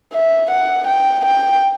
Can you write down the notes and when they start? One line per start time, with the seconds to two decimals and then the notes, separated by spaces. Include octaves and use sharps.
0.13 E5
0.50 F#5
0.87 G5
1.25 G5